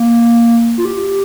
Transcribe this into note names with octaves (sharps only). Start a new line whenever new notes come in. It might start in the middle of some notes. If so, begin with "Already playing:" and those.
Already playing: A#3
F4
G4